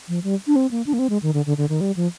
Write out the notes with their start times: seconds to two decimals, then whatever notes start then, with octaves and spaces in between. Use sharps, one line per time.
0.08 F3
0.24 G3
0.47 D4
0.56 C4
0.71 A#3
0.86 D4
0.93 A#3
0.99 C4
1.10 G#3
1.23 D#3
1.34 D3
1.46 D3
1.57 D3
1.69 D#3
1.81 G3
1.96 F3